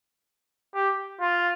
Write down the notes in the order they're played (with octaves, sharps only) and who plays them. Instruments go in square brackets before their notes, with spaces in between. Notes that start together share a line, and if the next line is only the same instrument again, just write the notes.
[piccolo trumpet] G4
F4